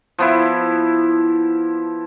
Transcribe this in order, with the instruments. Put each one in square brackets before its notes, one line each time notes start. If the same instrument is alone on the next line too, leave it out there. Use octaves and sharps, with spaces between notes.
[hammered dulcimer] F3 B3 E4